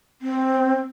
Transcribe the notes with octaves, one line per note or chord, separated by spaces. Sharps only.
C4